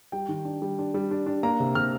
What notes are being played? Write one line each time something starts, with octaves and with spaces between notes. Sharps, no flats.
G3 G5
D#3
D4
G3
D4
G3
D4
D4
A#3 A#5
C3
C3 F6